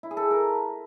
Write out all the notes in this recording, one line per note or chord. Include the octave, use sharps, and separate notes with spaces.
E4
G#4
A4
A#4